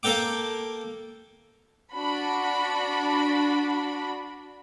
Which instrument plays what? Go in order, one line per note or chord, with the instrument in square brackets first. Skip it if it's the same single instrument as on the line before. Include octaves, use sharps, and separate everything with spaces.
[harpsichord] A#3 A4 A#4 G5 D6
[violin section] D4 F#4 B5